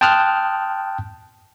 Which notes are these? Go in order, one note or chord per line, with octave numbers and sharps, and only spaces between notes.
G5 A5 C6 D#6 F6 F#6